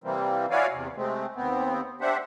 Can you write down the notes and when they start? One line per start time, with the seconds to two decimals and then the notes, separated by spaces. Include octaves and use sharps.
0.04 C3 E3 G3 A#3 C4
0.51 E4 F#4 C#5 D5 F5 G#5
0.73 E2 C3
0.96 C3 G#3 A3 C4
1.36 D#2 B3 C4
2.01 D4 G4 C5 E5 F#5